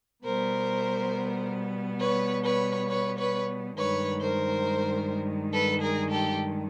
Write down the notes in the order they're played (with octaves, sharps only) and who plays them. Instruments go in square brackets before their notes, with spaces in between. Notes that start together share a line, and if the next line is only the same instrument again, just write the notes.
[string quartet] B2 G3 B3 A#4 C5
B4 C#5
B4 C#5
B4 C#5
B4 C#5
G2 D#3 G#3 B4 C#5
A#4 C5
A4 B4
G#4 A#4
G4 A4